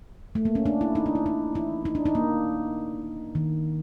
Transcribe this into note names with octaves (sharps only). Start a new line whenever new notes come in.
A3
A#3
C#4
D4
E4
D#4
D4
E4
D#4
E4
D#4
D4
D#4
A#3
D#3